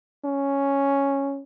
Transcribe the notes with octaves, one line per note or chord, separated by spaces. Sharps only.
C#4